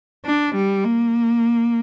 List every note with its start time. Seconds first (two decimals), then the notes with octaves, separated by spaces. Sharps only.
0.25 D4
0.54 G3
0.84 A#3